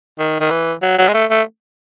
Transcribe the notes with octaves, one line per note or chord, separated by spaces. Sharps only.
D#3
D#3
E3
F#3
F#3
G#3
A3
A3